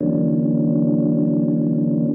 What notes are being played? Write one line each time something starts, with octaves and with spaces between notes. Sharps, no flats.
D3 E3 F#3 A#3 C#4 D4